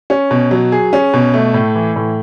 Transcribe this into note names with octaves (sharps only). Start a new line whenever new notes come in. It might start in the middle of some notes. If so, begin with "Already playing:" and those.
C#4
B2
F#3
G#4
C#4
B2
A3
A2
E3
A2